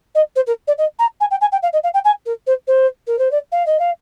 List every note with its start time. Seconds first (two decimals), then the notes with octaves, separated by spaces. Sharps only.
0.15 D#5
0.35 C5
0.46 A#4
0.67 D5
0.78 D#5
0.99 A#5
1.20 G#5
1.30 G5
1.41 G#5
1.52 G5
1.62 F5
1.73 D#5
1.83 F5
1.94 G5
2.04 G#5
2.25 A#4
2.46 C5
2.67 C5
3.07 A#4
3.18 C5
3.31 D5
3.52 F5
3.66 D#5
3.79 F5